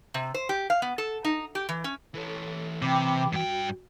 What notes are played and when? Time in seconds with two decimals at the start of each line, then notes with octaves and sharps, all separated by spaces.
0.14 C3
0.34 C5
0.49 G4
0.70 F5
0.82 B3
0.98 A4
1.24 D#4
1.55 G4
1.69 E3
1.84 C#4
2.15 E3 A4 C#5
2.82 C3 G5 B5 D6
3.33 G2 F#4 G5